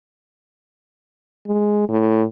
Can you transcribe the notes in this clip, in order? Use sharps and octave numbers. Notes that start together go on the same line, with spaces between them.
G#3
A2